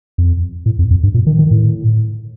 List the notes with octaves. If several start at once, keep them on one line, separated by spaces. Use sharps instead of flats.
F2
A2
F2
F2
G2
A#2
D#3
D#3
A2